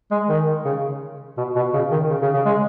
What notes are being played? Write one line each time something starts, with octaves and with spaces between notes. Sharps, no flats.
G#3
D#3
C#3
B2
B2
C#3
D#3
C#3
C#3
C#3
G#3